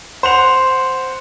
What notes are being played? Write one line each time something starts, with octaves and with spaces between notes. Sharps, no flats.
C5 F#5 F7